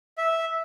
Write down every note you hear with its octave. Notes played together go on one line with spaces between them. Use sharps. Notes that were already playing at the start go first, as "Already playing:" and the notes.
E5